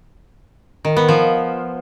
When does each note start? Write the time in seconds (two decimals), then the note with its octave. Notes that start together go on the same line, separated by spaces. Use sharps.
0.85 D#3
0.97 B3
1.09 F3